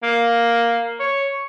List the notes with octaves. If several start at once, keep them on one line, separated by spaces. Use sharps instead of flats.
A#3
C#5